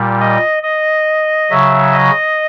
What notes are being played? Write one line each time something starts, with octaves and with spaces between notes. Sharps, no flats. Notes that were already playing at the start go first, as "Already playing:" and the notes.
Already playing: A#2 G3
D#5
D#5
C#3 F#3 E5
D#5